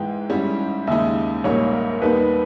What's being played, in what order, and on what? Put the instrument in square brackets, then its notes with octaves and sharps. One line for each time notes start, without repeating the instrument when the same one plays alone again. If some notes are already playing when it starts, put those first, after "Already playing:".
Already playing: [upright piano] G#2 E3 G#3 B3 E4 [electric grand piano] G5
[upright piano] G#2 G3 C#4 E4
[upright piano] D#2 C#3 G#3 D#4 [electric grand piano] E5
[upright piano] A#1 G#2 G3 A#3 D#4 [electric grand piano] C#5
[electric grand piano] A#4
[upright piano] D#2 D#3 G3 B3 D#4 [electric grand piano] B4